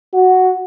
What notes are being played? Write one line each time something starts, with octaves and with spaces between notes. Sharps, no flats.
F#4